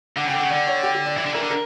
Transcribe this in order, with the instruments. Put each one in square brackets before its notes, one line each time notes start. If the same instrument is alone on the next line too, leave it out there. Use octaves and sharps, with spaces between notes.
[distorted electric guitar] D3 [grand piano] F#5
[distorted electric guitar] C#3 [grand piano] G5
[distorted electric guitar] D3
[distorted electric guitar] C#3 [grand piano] F#5
[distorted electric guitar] D3 [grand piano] D5
[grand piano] C#5
G4
G4
D5
[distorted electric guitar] E3 [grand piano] D5
[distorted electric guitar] D3
[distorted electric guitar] E3 [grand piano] A#4
[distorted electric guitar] D3
[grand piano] A#4